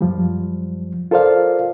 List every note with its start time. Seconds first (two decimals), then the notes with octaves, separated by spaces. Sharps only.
0.01 F#2 F3 G3
1.11 F4 A4 A#4 C5 D5 F5